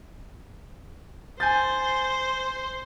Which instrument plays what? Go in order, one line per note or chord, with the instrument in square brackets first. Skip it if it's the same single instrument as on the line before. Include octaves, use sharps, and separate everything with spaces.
[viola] C5 [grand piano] G#5 G6 A6